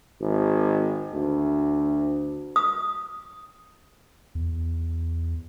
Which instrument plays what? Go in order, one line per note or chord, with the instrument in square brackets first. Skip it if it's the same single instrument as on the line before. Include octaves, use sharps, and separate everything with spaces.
[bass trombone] G#1
D2
[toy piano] D#6
[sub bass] E2